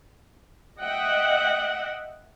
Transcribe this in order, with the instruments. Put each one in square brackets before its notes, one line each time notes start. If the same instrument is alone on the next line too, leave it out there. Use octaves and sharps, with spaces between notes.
[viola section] D#5 E5 F#5 G5